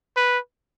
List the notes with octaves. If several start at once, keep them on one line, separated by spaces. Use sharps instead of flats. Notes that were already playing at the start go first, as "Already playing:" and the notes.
B4